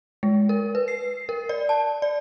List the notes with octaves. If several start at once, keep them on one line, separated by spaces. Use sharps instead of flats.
G#3
A#4
B4
C7
A#4
D5
A5
D5